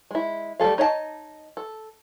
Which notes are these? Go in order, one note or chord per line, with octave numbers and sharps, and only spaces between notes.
G#3 E4
G3 A3 G#4 A4 F5
D#4 C#5 D#5 F#5 A5
A4